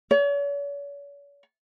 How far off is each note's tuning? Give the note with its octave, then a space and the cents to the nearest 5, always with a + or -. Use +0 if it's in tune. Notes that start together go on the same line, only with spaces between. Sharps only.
C#5 +45